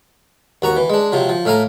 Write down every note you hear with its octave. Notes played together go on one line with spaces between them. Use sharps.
D#2 F#4 A#5 C#6
E3
G#3 D4
C3 F3 F#3
F3
A2 A3 F5 G#5 A#5